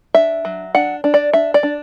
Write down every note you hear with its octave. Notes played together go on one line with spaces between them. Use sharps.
D4 E5
F#3
D4 F#5
D4
D5
D4 E5
D5
D4